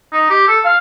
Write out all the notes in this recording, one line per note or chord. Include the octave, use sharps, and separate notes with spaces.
D#4
G4
A4
F5